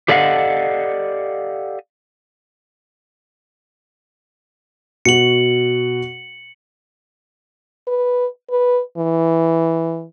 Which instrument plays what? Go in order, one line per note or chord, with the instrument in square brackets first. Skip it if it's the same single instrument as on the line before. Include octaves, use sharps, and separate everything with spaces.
[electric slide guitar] G4 A4 D5 D#5 F5 F#5
[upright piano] B2 F#4 [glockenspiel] C#7 F#7
[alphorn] B4
B4
E3